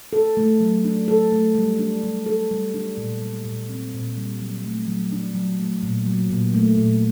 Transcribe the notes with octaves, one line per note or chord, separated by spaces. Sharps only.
A4
A3
F#3
D4
A4
A3
G3
D4
G3
A4
G3
D4
A#2
G3
A#2
C4
A#2
G3
F#3
A3
F#3
D4
F#3
A3
A#2
F#3
A#2
A3
A#2